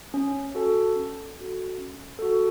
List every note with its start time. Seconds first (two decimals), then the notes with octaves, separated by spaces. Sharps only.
0.14 C#4
0.55 F#4 A4
0.96 C#4
1.37 F#4 A4
1.78 C#4
2.19 F#4 A4